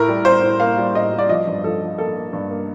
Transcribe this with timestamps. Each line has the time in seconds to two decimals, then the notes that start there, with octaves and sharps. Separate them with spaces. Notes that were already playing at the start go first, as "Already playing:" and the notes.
Already playing: A2 A#4
0.08 G3
0.25 G3 C5
0.42 A2
0.60 A#3 F5
0.78 G3
0.94 A2 D#5
1.12 G3
1.19 D5
1.29 F3 D#5
1.47 G2
1.64 F3 A4
1.81 F3
1.98 A#3 A4
2.16 A#3
2.33 G2
2.51 A#3